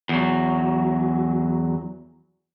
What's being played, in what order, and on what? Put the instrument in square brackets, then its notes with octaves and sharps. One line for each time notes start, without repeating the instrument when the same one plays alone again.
[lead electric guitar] E2 F#3